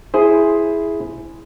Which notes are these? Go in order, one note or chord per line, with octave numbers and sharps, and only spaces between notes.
E4 G#4 C5